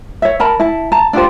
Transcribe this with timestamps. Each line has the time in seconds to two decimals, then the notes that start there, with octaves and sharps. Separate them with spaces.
0.22 C#5 E5
0.40 A#4 A5 B5
0.60 E4 A5
0.92 A5 A#5
1.13 D4 F4 G4 C5